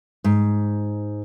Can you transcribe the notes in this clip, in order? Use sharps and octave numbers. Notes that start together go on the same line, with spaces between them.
G#2